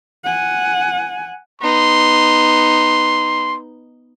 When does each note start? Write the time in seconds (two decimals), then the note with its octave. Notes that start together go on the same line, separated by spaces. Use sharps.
0.24 F#5 G#5
1.62 B3 D#4 C6